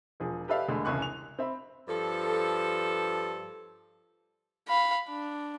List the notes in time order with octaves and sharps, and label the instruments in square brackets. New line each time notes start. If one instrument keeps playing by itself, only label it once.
[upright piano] E1 F3 G#4
G4 A4 B4 D5 E5 F5
E1 D3 G#3 A3 B5
E1 C2 C#3 G#5 C#6 F#6
F7
C4 E5 B5
[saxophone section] G2 F3 A4
[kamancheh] F5 B5
D4